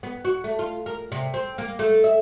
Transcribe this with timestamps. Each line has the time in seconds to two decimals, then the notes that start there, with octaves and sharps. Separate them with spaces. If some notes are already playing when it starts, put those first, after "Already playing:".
0.03 B3
0.25 F#4
0.44 A3
0.59 F4
0.86 A#4
1.12 C3
1.34 C4
1.58 A#3
1.79 A3
2.04 E5